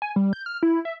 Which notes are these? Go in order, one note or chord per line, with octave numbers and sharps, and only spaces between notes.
G#5
G3
G6
F6
E4
E5